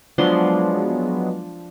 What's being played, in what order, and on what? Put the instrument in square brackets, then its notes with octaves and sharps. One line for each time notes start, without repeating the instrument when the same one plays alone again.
[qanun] F3 D4 C6 [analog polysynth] F#3 G#3 B3